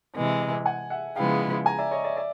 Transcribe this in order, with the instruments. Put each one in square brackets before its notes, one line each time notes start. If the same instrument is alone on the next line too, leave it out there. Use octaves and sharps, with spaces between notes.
[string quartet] C3 E3 G#3
[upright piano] F#5 G#5
E5 F#5
[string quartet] C#3 F3 G#3 B3 E4 [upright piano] F5 G5
[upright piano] G#5 A#5
D5 E5
C#5 D#5
D5 E5
D5 E5